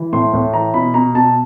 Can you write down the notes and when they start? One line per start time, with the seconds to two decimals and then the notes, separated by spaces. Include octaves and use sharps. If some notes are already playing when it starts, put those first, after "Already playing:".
Already playing: E3
0.13 A2 C6
0.33 A2
0.53 E3 A#5
0.74 B2 B5
0.94 B2 A#5
1.14 B2 A5